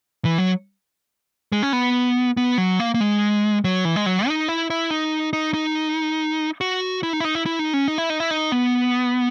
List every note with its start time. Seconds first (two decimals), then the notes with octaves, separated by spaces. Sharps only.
0.25 E3
0.38 F#3
1.52 G#3
1.63 C#4
1.73 B3
2.37 B3
2.58 F#3
2.80 A#3
2.94 A#3
3.00 G#3
3.64 F#3
3.85 E3
3.96 G#3
4.06 F#3
4.28 D#4
4.49 E4
4.70 E4
4.91 D#4
5.33 D#4
5.54 D#4
6.61 F#4
7.03 E4
7.13 D#4
7.21 E4
7.25 D#4
7.35 E4
7.46 E4
7.59 D#4
7.73 C#4
7.88 D#4
7.98 E4
8.10 D#4
8.20 E4
8.31 D#4
8.52 B3